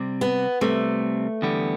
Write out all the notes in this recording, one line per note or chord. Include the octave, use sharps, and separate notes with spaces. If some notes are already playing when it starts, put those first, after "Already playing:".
Already playing: C3 G3 C4
B3
C3 G3 A3 C4
E2 D3 G3 B3